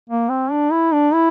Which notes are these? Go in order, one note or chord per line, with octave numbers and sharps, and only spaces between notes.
A#3
C4
D4
E4
D4
E4